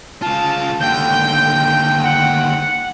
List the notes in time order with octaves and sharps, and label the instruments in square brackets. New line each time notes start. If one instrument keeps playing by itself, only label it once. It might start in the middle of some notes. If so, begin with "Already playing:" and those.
[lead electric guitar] C#3 F4 [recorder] A5
[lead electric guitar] D#2 D3 [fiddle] G5 [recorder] G6
[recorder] F#5